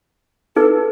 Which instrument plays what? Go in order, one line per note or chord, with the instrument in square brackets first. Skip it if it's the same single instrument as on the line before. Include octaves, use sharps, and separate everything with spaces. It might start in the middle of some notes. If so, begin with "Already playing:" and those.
[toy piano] D#4 G#4 B4 [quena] A4